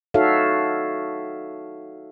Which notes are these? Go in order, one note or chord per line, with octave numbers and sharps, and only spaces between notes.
D#4 F#4 A4 C#5 E5 F5